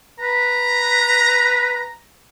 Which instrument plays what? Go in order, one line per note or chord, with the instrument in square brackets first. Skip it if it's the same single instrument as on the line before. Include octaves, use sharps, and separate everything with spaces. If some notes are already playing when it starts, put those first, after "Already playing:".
[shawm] B4 [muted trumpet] A#5